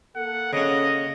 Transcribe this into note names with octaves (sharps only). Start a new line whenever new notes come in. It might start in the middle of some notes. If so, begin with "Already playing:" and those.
A#3 A4 F#5
C#3 C#4 D#5